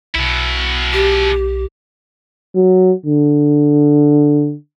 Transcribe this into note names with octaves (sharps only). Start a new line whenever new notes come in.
B1 B2 E4
G4
F#3
D3